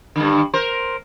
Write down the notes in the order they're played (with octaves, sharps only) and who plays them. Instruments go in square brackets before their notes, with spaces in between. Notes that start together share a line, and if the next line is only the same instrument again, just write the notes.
[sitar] G2 D3
A#4 C5